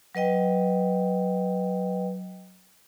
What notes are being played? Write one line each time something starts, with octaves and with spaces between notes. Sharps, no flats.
F#3 B4 D#5 G5